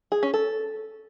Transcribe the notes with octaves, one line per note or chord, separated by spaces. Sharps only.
G#4
C#4
A4